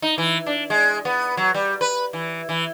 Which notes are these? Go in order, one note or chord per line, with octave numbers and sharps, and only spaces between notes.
D#4
E3
D4
G#3
B3
F#3
G3
B4
E3
E3